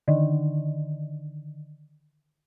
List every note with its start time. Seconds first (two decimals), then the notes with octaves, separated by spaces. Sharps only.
0.08 D3 D#3